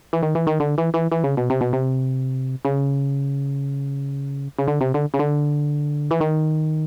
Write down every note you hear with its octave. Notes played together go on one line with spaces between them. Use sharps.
E3
D#3
E3
D#3
D3
E3
E3
E3
C#3
B2
C3
B2
C3
C#3
C#3
D3
C3
D3
C#3
D3
E3
D#3